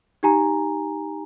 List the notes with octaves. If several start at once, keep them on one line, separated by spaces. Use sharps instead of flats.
D#4 G4 G#5 A#5